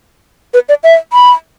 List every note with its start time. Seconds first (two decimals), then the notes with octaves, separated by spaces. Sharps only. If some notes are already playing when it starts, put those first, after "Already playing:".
0.54 B4
0.69 D5
0.84 E5
1.13 B5